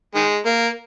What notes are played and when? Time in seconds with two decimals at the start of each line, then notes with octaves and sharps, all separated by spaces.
0.15 D#3 G#3
0.46 A#3